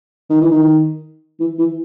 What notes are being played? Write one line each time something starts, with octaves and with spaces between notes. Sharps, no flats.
D#3
E3
D#3
E3
E3